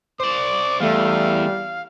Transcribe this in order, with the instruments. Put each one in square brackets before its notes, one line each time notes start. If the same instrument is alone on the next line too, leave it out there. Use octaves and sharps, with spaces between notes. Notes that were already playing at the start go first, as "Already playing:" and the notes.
[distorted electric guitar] C5 D5 [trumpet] D6
[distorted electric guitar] E2 [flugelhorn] G3 [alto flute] A3 [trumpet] F5